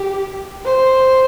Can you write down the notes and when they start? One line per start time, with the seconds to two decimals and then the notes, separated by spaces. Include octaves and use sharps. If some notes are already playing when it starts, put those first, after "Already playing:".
Already playing: G4
0.65 C5